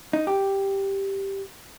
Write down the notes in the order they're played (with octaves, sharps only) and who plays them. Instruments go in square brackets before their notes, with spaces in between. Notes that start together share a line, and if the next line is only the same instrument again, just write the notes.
[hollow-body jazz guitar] D#4
G4